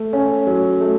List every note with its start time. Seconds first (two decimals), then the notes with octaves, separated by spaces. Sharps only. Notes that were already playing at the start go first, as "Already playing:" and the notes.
Already playing: A3
0.13 C#4
0.47 F#3
0.81 A3